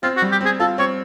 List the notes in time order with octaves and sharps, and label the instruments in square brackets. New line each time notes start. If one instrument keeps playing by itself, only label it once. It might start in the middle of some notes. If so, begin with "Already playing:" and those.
[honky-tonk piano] C4 [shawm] F4
[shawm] F#4
[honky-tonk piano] G3
[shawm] G4
[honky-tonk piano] C4 [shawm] G#4
[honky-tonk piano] F4 [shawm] A4
[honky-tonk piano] C4 [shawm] C#5